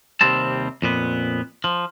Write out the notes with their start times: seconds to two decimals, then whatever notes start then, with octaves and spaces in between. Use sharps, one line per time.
0.21 D#2 C3 G3 C4 A5
0.82 F2 A#2 B3
1.64 F3